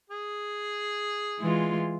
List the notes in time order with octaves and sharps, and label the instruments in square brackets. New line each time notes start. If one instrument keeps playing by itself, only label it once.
[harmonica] G#4
[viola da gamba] E3 G#3 F4